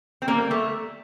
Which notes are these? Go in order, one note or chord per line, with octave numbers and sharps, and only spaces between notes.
C4
G3 A#3
A3